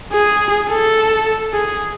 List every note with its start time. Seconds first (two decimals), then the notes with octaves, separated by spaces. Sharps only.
0.12 G#4
0.69 A4
1.53 G#4